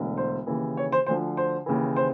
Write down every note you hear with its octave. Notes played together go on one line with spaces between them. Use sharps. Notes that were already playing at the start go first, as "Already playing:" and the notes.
Already playing: E1 D2 D3
C5
D#2 C#3 E3
C#5
C5
D2 D3 F3 C5
C5
D#2 C#3 E3
C5